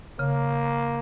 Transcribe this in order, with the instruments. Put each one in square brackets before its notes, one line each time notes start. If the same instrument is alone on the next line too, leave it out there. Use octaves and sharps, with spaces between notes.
[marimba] C#3 [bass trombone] A#3